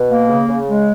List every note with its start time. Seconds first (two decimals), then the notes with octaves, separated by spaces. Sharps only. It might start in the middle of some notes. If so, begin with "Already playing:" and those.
Already playing: B2
0.10 A#3
0.29 C#3
0.49 C#3
0.69 G#3